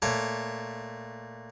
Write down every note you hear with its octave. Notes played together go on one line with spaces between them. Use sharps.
A#2 A3 C#5